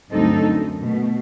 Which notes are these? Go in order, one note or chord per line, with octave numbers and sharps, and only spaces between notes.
D2 G2 F#3 C4 D#4 A4
F#2
B2 A3